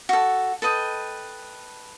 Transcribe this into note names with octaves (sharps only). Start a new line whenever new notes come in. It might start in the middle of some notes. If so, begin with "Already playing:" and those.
F#4 A4
A4 B4 D#5 G5